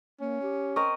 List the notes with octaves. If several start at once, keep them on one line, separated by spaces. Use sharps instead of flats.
A#3 C#4
G4
C4 A#4 D#5 C#6